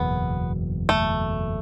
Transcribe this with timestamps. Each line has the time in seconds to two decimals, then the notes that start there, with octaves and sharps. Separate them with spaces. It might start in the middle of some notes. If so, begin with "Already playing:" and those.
Already playing: F#1 E2 B2 F#3 B3
0.89 A3